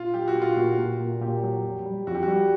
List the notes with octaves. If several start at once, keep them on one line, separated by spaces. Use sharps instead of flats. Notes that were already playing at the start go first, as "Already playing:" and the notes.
Already playing: A#2 F4
F#3 G4
F#4
A#2
F4
A#2 F#4
A#2
A#2
A#2 G4
F#3
F2
G3
F2 F#4
G4
F#4
G3